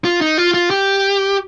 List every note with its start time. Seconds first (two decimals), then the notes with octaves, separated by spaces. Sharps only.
0.05 F4
0.21 D#4
0.38 F4
0.54 F4
0.71 G4